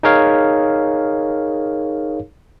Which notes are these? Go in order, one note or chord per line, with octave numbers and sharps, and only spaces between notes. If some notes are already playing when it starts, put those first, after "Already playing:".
D#4 G#4 A#4 C#5 F5